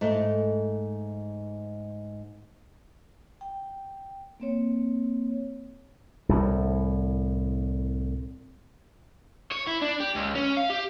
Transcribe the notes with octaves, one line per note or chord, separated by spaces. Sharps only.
G#2 A3
G5
A#3 C4 C#5
C2 A2
C#5
E4
D4
G4
C#2
C#4
F5
G4